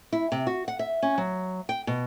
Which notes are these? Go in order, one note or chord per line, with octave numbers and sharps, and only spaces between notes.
E4
C3
F#4
F#5
E5
C#4
F#3
G5
B2